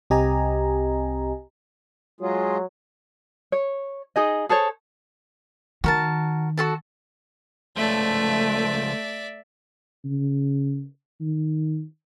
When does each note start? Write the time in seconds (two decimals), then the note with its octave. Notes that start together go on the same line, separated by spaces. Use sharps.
0.10 C2 C4 G4 D#5 G#5 A#5
2.21 F#3 G#3 F4 G#4
3.52 C#5
4.16 D#4 G#4 D#5
4.49 G#4 A4 C5 C#5
5.84 D#3 F#4 A#4 A5
6.57 F#4 A4 A5
7.76 C#2 F3 A3 D5 E5
10.05 C#3
11.21 D#3